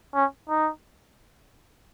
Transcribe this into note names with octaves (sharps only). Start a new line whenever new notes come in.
C#4
D#4